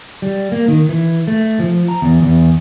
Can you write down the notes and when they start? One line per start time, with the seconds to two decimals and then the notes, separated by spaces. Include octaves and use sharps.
0.22 G3
0.52 A#3
0.68 D#3
0.89 E3
1.28 A3
1.60 F3
1.88 A#5
2.02 E2
2.22 E2